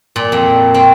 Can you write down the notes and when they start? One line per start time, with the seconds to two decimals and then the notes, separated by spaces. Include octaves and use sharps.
0.16 A#2
0.32 F2
0.74 C4